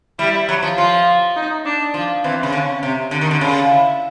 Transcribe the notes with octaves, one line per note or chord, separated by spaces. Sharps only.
G3 E4
F#3
F3
F3 F4
D#4
D4
F3
E3 C4
C#3
D3 C#4
C3
D3
D#3
D3
C#3 F4
E4